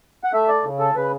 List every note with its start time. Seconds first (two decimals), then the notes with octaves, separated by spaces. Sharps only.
0.24 F#5
0.33 A3 E5
0.48 D5
0.64 C#3
0.79 A4
0.95 C#3 B4